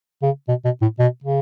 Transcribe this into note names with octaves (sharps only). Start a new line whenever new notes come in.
C#3
B2
B2
A2
B2
C#3